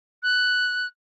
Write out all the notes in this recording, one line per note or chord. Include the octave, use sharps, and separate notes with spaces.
F#6